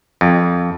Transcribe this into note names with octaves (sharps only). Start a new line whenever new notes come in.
F2